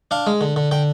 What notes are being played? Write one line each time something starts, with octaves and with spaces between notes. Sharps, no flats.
D4 F5
G#3
D3
D3
D3 G5